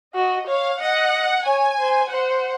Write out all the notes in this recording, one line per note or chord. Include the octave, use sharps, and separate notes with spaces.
F#4 D#5
C#5 F5
D#5 F#5
C#5 G#5
C5
C5 F#5